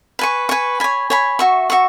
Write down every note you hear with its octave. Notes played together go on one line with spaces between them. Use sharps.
B4 G#5 C#6
B4 G#5 C#6
C#5 G#5 B5
C#5 G#5 B5
F#4 E5 C#6
F#4 E5 C#6